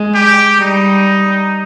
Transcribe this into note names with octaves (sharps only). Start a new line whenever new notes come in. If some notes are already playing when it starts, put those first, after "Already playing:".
Already playing: G#3
G4
G3 D#4